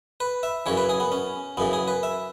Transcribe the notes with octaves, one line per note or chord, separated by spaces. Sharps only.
B4
E5
F#2 C#3 E3 C#5
B4
G#4
B3
C#4
F#2 C#3 E3 B3
G#4
B4
E5